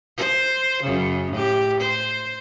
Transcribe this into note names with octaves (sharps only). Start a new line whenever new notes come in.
C5
F#2 C#3
A2 G4
C5